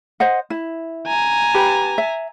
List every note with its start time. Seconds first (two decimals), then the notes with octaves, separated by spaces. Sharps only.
0.20 C5 D#5 F#5
0.50 E4
1.08 G#5 A#5
1.54 G4 B4 B5
1.98 E5